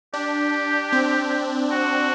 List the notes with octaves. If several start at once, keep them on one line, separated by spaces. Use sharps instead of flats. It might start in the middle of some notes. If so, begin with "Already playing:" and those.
D4 G4
C4
F#4